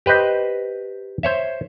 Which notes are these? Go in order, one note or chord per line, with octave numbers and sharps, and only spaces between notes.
G4 B4 C5 D#5
C5 C#5 E5